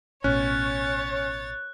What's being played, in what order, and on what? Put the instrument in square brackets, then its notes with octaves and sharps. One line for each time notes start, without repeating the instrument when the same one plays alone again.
[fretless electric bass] A1 B2 [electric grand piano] C#4 [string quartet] C#5 A6 [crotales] F#6